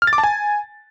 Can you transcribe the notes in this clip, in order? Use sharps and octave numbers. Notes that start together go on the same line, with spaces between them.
F6
A6
D6
A5
G#5